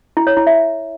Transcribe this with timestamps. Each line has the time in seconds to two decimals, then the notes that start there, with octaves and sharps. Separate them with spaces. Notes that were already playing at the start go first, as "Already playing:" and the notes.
0.17 E4
0.27 C#5
0.37 E4
0.47 E5